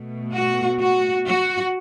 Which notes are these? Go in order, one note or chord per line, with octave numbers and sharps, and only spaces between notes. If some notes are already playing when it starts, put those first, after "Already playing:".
Already playing: B2 A3
F#4
F#4
F#4